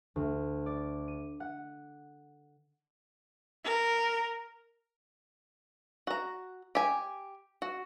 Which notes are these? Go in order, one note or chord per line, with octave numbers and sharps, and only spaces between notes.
D2
D5
D#7
F#5
A#4
F#4 A#5
G4 G#5
F#4